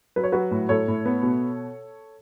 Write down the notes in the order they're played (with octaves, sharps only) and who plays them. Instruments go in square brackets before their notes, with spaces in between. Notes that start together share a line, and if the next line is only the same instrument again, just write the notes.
[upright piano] F#3 B4
C#5
F#3 F#4 B4
A2
A2 A4 C#5
A2
B3
B2